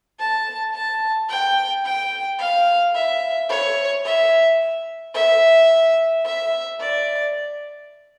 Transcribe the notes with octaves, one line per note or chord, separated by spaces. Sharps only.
A5
A5
G5
G5
F5
E5
C#5
E5
E5
E5
D5